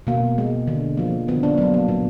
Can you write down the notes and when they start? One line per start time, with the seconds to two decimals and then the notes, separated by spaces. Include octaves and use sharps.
0.07 B2 A#3
0.38 G#3
0.68 D3
0.97 F3 A#3
1.28 D3 B3
1.43 A#3 D4
1.58 F#3 A#3 B3
1.74 A#3
1.88 A#2 B3